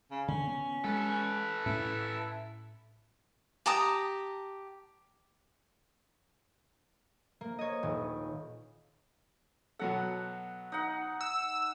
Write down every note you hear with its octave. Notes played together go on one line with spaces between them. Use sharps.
C#3
D3 C#4
B3
G#3 A4 B4
A2 C#4 E4
G4 A5 A#5 D#6
A#3
C#5 D#5
D#1
B2 F#3 A4 F#5
D#4 F#5
E6